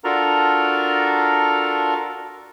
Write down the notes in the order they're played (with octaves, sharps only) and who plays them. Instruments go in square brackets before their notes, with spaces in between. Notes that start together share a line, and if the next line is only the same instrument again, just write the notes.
[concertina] D4 F4 F#4 A4 A#4 A#5